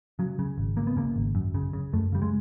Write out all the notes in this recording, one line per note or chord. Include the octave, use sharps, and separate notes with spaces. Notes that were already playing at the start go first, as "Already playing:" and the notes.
C#3 F#3
C#3
G#1
C#3 A#3
B3
C#3 A#3
G#1
F#2
C#3
C#3
F#2 A3
C#3 G3
G#3